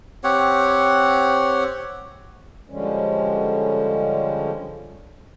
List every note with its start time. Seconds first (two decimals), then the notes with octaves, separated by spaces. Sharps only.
0.24 C4 G4 C#5 F#5
2.70 D3 F3 G3 G#3 C#4